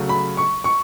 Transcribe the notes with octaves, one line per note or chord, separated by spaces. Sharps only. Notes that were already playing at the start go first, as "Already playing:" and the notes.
Already playing: C#3 F#3 A3
B5
C#6
C#6